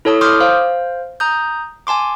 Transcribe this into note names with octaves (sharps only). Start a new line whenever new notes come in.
E4 A4 C#5 A5 D#6
C6 D6 D#6 F6 G6
C5 F5
A#5 D#6 G6
G#5 A5 C6 D6